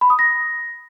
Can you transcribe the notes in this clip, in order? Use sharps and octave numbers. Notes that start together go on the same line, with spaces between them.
B5
D#6
A#6